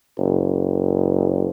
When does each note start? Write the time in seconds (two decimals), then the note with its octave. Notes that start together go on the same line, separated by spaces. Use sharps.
0.18 F#1